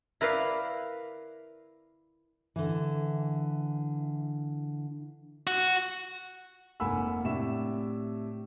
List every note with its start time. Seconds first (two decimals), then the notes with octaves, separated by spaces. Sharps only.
0.21 E4 A#4 B4 D5 F5
2.56 D3 E3
5.47 F#4
6.80 F1 A#3 F#5 G#5 B5 E6
7.24 A2 C3 D4 E5 E7